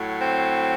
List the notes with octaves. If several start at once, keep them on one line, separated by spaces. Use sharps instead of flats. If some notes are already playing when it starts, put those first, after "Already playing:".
Already playing: A2 F#3
C4